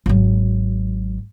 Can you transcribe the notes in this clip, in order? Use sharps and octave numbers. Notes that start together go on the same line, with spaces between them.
G#1 F#3